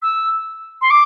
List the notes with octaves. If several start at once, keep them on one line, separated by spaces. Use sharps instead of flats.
E6
C6
D6